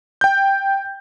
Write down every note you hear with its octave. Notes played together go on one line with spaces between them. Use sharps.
G5 G6